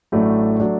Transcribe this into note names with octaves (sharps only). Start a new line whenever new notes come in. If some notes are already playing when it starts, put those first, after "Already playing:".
A1 A2 F#3 A3 D4
F#3 A3 D4